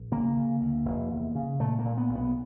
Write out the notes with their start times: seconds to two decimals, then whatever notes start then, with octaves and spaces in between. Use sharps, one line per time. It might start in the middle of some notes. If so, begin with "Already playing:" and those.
Already playing: A#1
0.12 C#3 A#3
0.37 C#3
0.61 D2
0.85 F1
1.11 E2
1.35 C#3
1.60 A#2 A3
1.79 A#3
1.85 A#2
1.97 B3
2.09 B1
2.15 B3